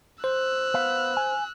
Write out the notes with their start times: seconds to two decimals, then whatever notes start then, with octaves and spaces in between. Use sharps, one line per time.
0.24 C5 E6 F#6
0.74 B3 F5
1.17 G#5